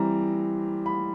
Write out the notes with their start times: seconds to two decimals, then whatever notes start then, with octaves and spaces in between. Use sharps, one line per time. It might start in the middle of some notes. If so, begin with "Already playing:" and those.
Already playing: E3 G3 C4 A#5
0.86 B5